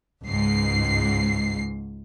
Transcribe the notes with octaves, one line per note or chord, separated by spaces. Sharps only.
C#2 G#2 C7